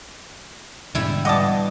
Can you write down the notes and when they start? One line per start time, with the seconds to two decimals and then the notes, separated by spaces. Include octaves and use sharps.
0.95 G#2 B2 D3 G3 E4
1.25 G2 E3 D#5 F#5 A5 D6 D#6